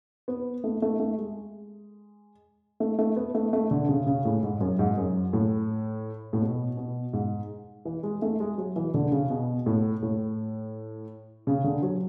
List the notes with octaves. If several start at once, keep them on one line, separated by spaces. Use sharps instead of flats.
B3
A3
A3
A3
G#3
A3
A3
B3
A3
A3
D3
C#3
C#3
A2
G#2
F#2
G#2
F#2
A2
A2
B2
B2
G#2
E3
G#3
A3
G#3
F#3
E3
D3
C#3
B2
A2
A2
C#3
D3
F#3